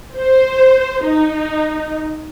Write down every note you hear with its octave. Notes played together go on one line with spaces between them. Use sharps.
C5
D#4